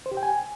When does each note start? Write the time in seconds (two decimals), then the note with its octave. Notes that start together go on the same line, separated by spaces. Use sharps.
0.06 C5
0.11 G4
0.17 G5
0.23 G#5